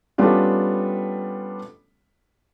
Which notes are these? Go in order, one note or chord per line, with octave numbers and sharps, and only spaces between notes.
G3 A3 B3 C#4 D4 F4